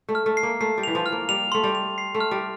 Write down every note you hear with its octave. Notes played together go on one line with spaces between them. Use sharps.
A3
F6
A3
C7
A#3
A3 C7
G3
E3 F7
F3
F6
A#3
G3 F7
A3 C6
G3
F7
C7
A3
F6
G3